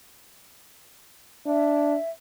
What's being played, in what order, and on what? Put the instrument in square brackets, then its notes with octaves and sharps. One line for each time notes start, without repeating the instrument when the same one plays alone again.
[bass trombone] D4 [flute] E5